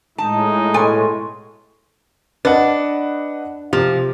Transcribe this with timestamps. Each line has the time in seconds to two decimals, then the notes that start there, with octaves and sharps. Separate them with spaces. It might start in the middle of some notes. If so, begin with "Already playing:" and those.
0.18 A2 G#3 D#4 A5
0.74 B2 A4 G#5 C6 C#6
2.45 D4 B4 D#5 F#5
3.73 C3 F3